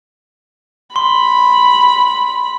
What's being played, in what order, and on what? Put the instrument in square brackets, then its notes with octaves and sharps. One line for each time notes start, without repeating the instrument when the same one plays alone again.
[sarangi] B5 [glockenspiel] C6